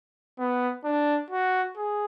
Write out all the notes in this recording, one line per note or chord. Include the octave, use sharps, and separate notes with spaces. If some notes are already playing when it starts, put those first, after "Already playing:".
B3
D4
F#4
G#4